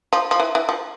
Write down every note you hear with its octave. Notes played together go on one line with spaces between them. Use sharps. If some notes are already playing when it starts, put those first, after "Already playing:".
F3
F3
E3
E3
F3